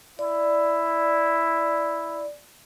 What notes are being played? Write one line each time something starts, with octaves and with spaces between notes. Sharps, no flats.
E4 D5